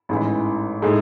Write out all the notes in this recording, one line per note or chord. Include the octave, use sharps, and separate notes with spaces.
A1 G#2 E3
A2 G#3 D#4